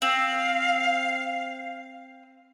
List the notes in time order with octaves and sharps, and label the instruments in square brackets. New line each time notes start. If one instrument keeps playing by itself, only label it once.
[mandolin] C4 [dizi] F5